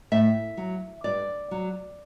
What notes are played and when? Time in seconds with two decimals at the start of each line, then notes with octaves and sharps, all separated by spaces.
0.12 A2 E5
0.57 F#3
1.04 G2 D5
1.51 F#3